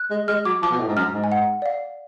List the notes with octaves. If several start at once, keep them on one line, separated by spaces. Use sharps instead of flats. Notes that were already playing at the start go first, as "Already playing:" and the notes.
Already playing: F#6
G#3
G#3 F6
F#3 D6
F3 D6
B2
A2
G#2
F#2 F6
G#2
G#5
F#5
D5
F5